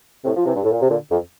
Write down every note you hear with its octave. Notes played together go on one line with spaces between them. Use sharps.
A2 C3
F3
C3 E3
G2
A2
A#2
C3
A#2 D3
F2